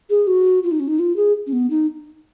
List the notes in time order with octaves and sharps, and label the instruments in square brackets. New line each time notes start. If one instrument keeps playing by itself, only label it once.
[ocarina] G#4
F#4
F4
D#4
C#4
D#4
F4
G#4
C#4
B3
D#4